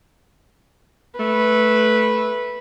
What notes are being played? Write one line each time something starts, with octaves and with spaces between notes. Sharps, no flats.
A3 B4